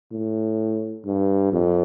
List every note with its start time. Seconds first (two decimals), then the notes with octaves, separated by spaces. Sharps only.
0.12 A2
1.05 G2
1.52 F2